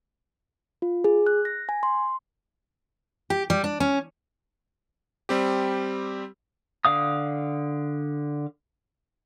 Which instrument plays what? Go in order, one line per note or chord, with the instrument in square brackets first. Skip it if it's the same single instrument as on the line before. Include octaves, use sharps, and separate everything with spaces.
[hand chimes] F4
G#4
F#6
A#6
G#5
C6
[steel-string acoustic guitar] G4
G3
D4
C#4
[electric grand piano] G3 C4 G4
[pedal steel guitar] D3 F5 D#6